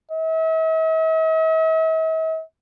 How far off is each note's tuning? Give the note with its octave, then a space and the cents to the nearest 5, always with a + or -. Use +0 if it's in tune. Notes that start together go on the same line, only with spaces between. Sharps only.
E5 -45